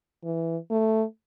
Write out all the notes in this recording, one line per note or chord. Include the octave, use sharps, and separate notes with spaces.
E3
A3